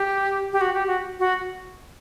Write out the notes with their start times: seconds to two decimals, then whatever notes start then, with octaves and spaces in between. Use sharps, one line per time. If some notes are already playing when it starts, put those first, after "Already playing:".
Already playing: G4
0.53 G4
0.61 F#4
0.74 G4
0.87 F#4
1.19 F#4